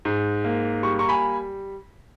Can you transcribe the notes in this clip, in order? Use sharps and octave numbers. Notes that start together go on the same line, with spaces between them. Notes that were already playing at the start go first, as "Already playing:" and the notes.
G#2
A#3
G3 C#6
A#5 C#6
G#5 B5